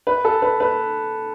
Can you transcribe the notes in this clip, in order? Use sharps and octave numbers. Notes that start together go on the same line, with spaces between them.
B4
A4
B4
B4